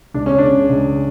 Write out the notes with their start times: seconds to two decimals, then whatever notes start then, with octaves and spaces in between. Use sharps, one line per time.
0.14 C#2 D4
0.26 C#4
0.38 C#3 G#3 D4
0.69 C#2